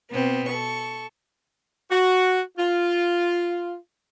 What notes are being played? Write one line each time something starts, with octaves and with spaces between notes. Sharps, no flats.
B2 B3 C4
A4 C#6
F#4
F4